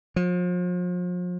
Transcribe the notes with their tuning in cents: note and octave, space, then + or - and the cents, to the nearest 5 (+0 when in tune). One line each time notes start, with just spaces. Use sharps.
F3 +40